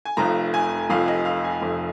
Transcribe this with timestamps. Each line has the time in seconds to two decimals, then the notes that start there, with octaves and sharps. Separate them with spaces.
0.05 G#5
0.17 F1 F2 F3 A#5
0.54 G#5
0.90 F1 F2 F3 F5
1.08 D#5
1.25 F5
1.44 G#5
1.62 F1 F2 F3